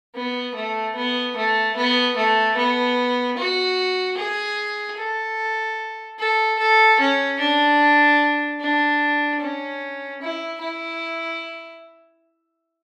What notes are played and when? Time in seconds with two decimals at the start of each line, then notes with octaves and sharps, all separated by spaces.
0.15 B3
0.55 A3
0.96 B3
1.36 A3
1.76 B3
2.16 A3
2.57 B3
3.37 F#4
4.17 G#4
4.98 A4
6.19 A4
6.58 A4
7.00 C#4
7.39 D4
8.61 D4
9.40 C#4
10.22 E4
10.61 E4